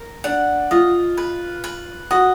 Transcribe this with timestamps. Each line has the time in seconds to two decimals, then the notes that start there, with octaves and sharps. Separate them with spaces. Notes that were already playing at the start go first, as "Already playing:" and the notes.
Already playing: A#4
0.24 D4 F#5
0.71 F4 D#5
1.17 B4
1.64 B4
2.11 F#4 D#5